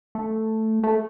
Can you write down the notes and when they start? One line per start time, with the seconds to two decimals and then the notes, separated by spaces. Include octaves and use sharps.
0.15 A3
0.83 A3